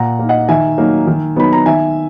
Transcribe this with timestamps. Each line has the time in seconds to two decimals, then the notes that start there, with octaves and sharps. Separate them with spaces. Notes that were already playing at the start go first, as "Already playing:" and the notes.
Already playing: A#2 F#5 A#5
0.19 A#3 D#4
0.29 D#5 F#5
0.49 D#3 E5 G#5
0.78 F#3 A#3 D#4
1.07 D#3
1.36 F#3 B3 D#4 B5
1.53 A#5
1.66 D#3 E5 G#5